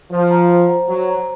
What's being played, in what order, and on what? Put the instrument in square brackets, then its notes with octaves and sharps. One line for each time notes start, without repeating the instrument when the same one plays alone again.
[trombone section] F3 [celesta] C5
[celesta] F#5 A#5
C5
F#5 A#5
[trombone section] F#3 [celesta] C5
[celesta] F#5 A#5